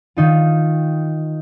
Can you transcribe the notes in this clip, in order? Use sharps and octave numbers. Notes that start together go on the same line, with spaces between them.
D#3 D#4 F4